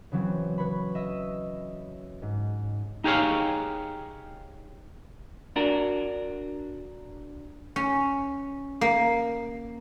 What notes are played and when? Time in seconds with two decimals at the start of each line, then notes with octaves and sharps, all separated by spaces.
0.12 C#3 E3 F#3 C4
0.58 B4 C#5 B5
0.95 D#5 E5 D#6 E6
2.22 G#2
3.04 D#4 G4 G#4 C#5 F5
5.56 D4 F#4 A#4
7.76 C#4
8.81 A#3